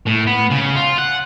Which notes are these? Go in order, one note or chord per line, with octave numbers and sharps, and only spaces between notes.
A2
B3
C#3
F4
F#5